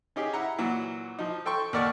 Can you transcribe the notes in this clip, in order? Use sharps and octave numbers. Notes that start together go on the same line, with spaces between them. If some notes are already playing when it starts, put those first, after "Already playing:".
C#4 D#4 G4 G#4
E4 F#5 A#5
A#2 E3 F#3
F3 D#4
A4 G5 C6 C#6
D#2 A#4 D5 F#5 C#6